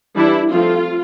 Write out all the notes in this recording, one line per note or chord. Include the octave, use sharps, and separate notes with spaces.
E3 G3 D4 E4
F3 A3 C4 F4